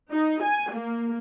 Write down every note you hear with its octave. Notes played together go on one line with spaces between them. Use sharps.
D#4
G#5
A#3